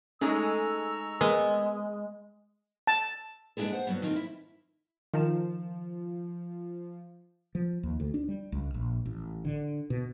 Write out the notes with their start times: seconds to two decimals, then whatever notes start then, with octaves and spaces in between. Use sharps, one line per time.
0.21 G#3 A3 C#4 D#4 A#5 C#6 E6
1.21 G#3 B3 A#4
2.87 A5
3.57 G#3 B3 D4 E4 G#4 A4
3.72 C5 F#5
3.87 G2 F#3 B3
4.02 D#3 F3 C4 C#4 F4 A#4
4.16 E4
5.14 D#3 F3 A#4 E7
7.55 F3
7.83 D#2
8.00 D2
8.14 D4
8.28 G3
8.52 C#2
8.74 A#1
9.06 A1
9.45 D3
9.90 B2